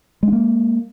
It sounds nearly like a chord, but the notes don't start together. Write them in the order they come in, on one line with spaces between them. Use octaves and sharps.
G#3 D4 A#3